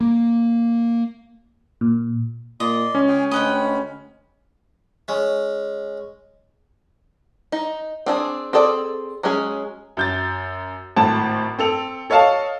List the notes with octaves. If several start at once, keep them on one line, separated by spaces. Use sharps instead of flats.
A#3
A#2
A#2 D5 D#5 C6
C#2 C#4
G#4 G5 G#5
D2 G#3 D#5 F#5 G5 B5
G#3 C#4
D#4
C4 D4 G#4
C4 G#4 A4 D5
F#3 G#3 C#4 G#4
F#2 G6 A6
G#1 A2 A5
C4 A4 F7
A4 C#5 D#5 F5 A5